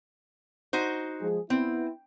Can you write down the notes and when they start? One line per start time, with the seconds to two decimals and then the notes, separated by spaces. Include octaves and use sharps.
0.73 D#4 F#4 C5
1.21 F3 G#3 G#4
1.50 B3 C4 E4